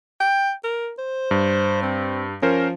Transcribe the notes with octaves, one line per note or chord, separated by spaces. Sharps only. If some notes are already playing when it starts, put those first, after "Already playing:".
G5
A#4
C5
G2
C4
F3 C#4 A#4 C5